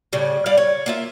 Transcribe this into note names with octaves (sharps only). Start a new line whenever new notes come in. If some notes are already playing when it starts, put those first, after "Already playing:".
A2 C#3 G3
G3 D5 F5
C#5
A#3 F4 E5